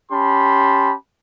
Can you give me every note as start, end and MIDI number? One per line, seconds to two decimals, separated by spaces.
0.12 0.93 61
0.12 0.93 67
0.12 0.93 81
0.12 0.93 83
0.12 0.93 84